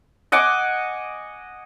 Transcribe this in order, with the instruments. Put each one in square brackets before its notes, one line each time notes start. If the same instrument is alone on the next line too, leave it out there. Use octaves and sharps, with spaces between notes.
[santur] D#5 F#5 G#5 D6